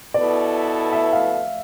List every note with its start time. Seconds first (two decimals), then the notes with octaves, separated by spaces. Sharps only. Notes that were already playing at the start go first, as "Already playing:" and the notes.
0.14 B2 B3 E4 A4 D5
0.93 E5
1.13 F5